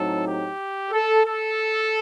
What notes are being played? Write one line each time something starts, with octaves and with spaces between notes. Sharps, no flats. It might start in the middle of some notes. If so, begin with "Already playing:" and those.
Already playing: A2 F#3 C4 D#4 A4
G4
A4
A4